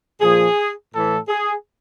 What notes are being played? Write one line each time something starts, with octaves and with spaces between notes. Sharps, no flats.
A#2 F3 G#4
A2 E3 A4
G#4